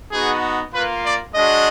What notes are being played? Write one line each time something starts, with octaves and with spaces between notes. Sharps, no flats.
B3 D#4 F#4 G#4
A#3 F4 B4
D5
G#3 D4 F#4 D#5